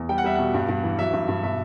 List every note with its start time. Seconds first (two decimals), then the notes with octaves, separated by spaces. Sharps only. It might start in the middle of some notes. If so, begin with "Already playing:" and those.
Already playing: E2
0.09 G3 G5
0.18 F#5
0.24 G3 E5
0.35 B2 F#5
0.54 G2
0.68 G2
0.83 E3
0.98 F#3 E5
1.13 G2
1.28 G2
1.43 B2 E5